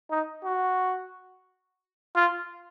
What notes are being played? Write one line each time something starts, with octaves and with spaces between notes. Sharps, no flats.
D#4
F#4
F4